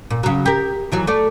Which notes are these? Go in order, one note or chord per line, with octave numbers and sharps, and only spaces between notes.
A#2
C#3 F#3
G4 A#4
D#3 E3 F#3
A3 D5